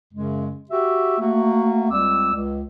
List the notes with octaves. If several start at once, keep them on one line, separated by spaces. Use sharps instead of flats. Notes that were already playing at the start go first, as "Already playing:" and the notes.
F#2 C#3 G#3
F#4 G4 E5
A3 A#3 F#4
C#2 G3 C4 D6 E6
C#2